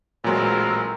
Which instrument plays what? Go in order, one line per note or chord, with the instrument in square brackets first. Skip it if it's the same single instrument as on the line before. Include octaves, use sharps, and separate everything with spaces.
[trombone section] A1 C4 A#4 [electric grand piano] A#2 F#3 G#3